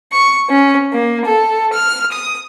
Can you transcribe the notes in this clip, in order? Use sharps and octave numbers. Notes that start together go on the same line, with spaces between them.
C#6
C#4
A#3
A4
F6
D#6